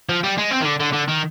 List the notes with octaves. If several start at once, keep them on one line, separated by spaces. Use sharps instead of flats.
F3
G3
G#3
C4
D#3
D3
D3
D3
D#3